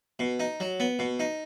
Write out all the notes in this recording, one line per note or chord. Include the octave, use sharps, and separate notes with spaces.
B2
D#4
F#3
B3
B2
D#4